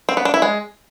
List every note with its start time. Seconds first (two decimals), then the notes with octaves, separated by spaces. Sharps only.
0.09 C4
0.17 B3
0.25 D4
0.34 E4
0.42 G#3